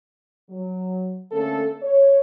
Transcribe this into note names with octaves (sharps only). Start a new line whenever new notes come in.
F#3
D3 A3 A#3 C#4 A4
C#5